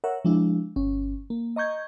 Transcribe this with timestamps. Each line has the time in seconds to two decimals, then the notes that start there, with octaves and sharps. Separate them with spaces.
0.04 A#4 C#5 E5 F#5
0.25 F3 G#3 D4 E4
0.76 G1 C#4
1.30 A#3
1.56 D#5 A#5 C#6 G6 G#6